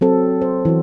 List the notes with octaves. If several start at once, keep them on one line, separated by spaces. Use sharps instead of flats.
F#3 C4 A4
C5
E3 F#4